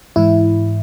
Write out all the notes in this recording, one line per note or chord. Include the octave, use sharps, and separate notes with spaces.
G#2 E3 E4